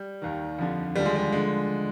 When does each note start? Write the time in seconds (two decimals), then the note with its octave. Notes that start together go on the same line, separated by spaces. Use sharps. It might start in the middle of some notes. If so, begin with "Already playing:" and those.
Already playing: G3
0.22 D#2 D#3
0.59 F2 D3 F3
0.96 D#2 D3 F3 G3
1.05 G#3
1.16 G3
1.32 D3 F3 G#3